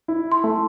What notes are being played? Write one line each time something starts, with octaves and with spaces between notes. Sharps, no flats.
E4
C6
A3